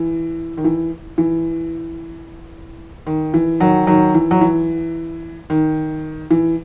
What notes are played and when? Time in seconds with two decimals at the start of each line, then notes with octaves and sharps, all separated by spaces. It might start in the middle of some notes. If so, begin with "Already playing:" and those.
Already playing: E3
0.57 D#3
0.64 E3
1.18 E3
3.07 D#3
3.34 E3
3.60 D#3 F#3
3.87 D#3 F#3
4.14 E3
4.31 F#3
4.41 E3
5.50 D#3
6.31 E3